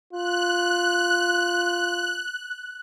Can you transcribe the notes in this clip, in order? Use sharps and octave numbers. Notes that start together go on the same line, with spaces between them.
F4 F#6